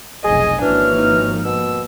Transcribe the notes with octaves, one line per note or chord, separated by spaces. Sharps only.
F1 B1 G#4 D#5 G#5
G#1 E3 F3 A#3 C#4 D4 F#4 F6
D#4
B2 E6